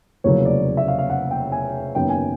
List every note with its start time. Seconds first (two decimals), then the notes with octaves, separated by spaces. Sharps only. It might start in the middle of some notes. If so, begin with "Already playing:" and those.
0.24 F1 E2 C#3 F#3 A#3 C#5
0.45 D5
0.77 E5
0.88 F5
0.99 F5
1.10 F#5
1.31 G5
1.52 G#5
1.95 F#1 F#2 D#3 F#3 B3 G5
2.09 G#5